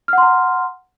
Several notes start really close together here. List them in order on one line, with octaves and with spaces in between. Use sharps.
F6 F#5 C6 A#5